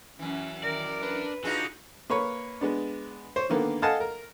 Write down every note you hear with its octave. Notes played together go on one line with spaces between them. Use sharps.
F#2 E3 C#4
D#3 A#4 D5
D4 B4
D3 D#4 F4 F#4 G#4
A#3 B4 C#5
G#3 B3 D4
C5 C#5
D3 D#3 A#3 B3
A4 D#5 F5 F#5 G#5 A5
A#4